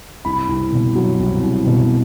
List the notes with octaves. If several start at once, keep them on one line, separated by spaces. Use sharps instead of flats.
C2 B5
C2
B2
F#3
C2
C2
B2